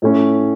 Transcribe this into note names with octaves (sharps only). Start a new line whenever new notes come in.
A2 A3 C#4